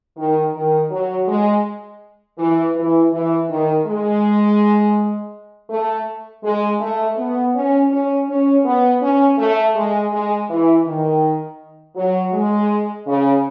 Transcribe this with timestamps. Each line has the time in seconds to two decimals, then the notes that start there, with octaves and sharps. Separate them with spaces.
0.17 D#3
0.55 D#3
0.91 F#3
1.28 G#3
2.38 E3
2.76 E3
3.13 E3
3.50 D#3
3.86 G#3
5.70 A3
6.44 G#3
6.80 A3
7.17 B3
7.55 C#4
7.91 C#4
8.29 C#4
8.65 B3
9.02 C#4
9.38 A3
9.76 G#3
10.12 G#3
10.50 E3
10.87 D#3
11.96 F#3
12.33 G#3
13.07 C#3